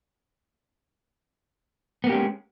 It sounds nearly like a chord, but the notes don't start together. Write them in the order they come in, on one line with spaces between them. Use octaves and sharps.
B3 A#3 G4 C#4 G#3